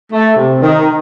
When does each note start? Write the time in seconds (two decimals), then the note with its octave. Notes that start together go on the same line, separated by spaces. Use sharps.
0.12 A3
0.36 C3
0.62 D#3